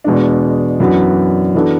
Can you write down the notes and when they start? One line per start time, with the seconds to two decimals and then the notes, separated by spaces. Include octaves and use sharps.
0.04 E2 B2 G#3 D4
0.80 F#2 E3 B3 D4 F#4
1.54 E3 B3 D4 F#4 A4